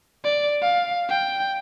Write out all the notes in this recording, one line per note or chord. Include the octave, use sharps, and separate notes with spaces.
D5
F5
G5